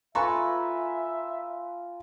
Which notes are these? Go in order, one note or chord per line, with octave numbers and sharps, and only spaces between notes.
F4 A4 B4 E5 G#5 A#5 C#6